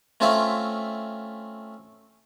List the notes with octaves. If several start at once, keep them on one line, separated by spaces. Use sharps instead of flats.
A3 C4 C#4 F4 E5